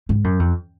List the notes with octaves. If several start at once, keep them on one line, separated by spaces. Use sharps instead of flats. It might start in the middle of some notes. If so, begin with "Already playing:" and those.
G#2
F#2
F2